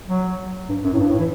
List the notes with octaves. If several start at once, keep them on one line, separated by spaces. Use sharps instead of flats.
F#3
G2
F#2
A2
G2
A2
E3